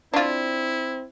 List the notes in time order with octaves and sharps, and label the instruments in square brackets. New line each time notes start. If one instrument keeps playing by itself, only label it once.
[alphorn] C4 [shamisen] D4 F4 [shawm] E4